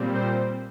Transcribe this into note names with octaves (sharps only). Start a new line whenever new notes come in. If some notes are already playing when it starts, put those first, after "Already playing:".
Already playing: A#2 G3 C4
C5